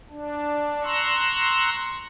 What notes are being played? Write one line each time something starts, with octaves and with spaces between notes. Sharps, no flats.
D4
A#5 C6 C#6 E6 F#6